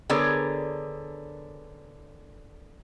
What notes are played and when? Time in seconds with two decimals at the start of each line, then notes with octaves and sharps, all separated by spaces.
0.10 D3 B3 G#4 A#4 C#5 D5